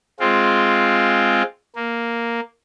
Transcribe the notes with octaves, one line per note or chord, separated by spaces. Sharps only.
G#3 C4 F4
A#3